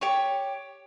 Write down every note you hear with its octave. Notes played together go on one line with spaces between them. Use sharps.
G4 C#5 C#6